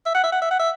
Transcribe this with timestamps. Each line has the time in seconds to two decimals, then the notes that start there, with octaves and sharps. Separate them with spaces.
0.06 E5
0.15 F#5
0.24 E5
0.32 F#5
0.42 E5
0.51 F#5
0.59 E5